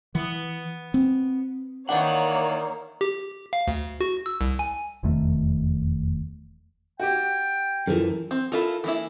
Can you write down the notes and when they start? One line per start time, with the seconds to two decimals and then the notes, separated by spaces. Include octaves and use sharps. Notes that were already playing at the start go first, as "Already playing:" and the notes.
0.15 E3 B3
0.94 C4
1.89 D#3 E3 A#3 D4 C#5 F#5
3.01 G4
3.53 F5
3.67 D2
4.01 F#4
4.26 E6
4.41 C2
4.59 G#5
5.03 F1 E2 D#3 A3
7.00 F#4 G4 G5
7.87 F#2 E3 F3 A4 A#4
8.31 C4
8.52 E4 F4 A4 A#4
8.84 E3 A#3 E4